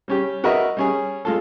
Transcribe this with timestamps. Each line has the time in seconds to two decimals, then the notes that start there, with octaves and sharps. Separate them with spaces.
0.08 G3 C#4 G4
0.44 F#4 A#4 B4 D#5 E5
0.77 G3 C#4 G#4
1.25 G#3 F4 A4